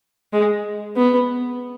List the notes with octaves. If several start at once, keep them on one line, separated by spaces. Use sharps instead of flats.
G#3
B3